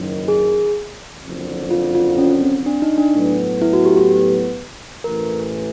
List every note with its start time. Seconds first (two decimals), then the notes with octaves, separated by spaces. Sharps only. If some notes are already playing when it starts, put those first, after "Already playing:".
Already playing: F#1 F#2 D#3
0.28 G#4
1.24 F#1 F2 D3 F3
1.71 F4
1.95 F4
2.18 C#4
2.42 C4
2.66 D4
2.82 D#4
2.98 D4
3.14 A2 F#3 B3
3.62 E4
3.73 F#4
3.85 G4
3.97 G4
5.04 A1 A2 E3 A#4